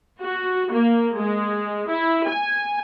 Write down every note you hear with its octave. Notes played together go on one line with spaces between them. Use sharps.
F#4
A#3
G#3
E4
G#5